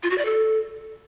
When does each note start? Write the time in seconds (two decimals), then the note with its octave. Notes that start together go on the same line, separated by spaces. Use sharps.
0.03 F4
0.10 F#4
0.18 D5
0.25 A4